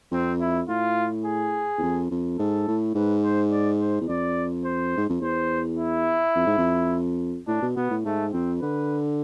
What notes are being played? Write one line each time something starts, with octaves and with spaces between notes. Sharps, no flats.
F2 C4
E4
A2 F4
G#4
E2
F2
F2
G#2 A4
A2
G#2 B4
C5
D5
C5
E2
F2 D5
C5
G#2
F2
E2 C5
E4
F2
G#2
F2
A2 D4
B2
B2 B3
A2
G#2 A3
F2 C4
D3 B4